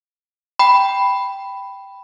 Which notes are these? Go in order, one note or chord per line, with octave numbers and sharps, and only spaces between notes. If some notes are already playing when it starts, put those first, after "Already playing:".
G5 B5